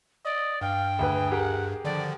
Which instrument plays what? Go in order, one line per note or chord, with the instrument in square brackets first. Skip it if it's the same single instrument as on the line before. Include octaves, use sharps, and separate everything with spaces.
[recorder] D5 [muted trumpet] D#5
[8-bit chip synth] G2 [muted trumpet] F5 [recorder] G5
[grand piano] D2 B4 [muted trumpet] G#4
[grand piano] G4 G#4 A#4 [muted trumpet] F#5
[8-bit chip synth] D3 D#3 F3 [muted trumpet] D4 [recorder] D5